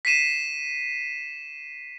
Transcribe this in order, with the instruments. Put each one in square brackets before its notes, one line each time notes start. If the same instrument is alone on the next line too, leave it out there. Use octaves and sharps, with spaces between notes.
[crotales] B6 C7 D#7 E7